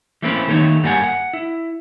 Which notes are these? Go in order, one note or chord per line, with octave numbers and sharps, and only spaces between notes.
E3 A3 A#3 C4 C#4 B4
D#3 A3 A#3 D#4 C#5
G2 G3 A#3 G4 F#5 G#5
F#5
E4